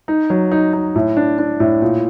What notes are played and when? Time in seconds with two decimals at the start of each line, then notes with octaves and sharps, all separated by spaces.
0.08 D#4
0.30 F#3
0.52 D#4
0.73 D#4
0.95 A2
1.17 D4
1.39 D4
1.60 A2
1.82 A#2